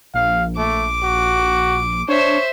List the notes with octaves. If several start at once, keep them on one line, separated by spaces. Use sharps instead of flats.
A#1 F5
A3 D6
F#4
D4 C5 C#5 E5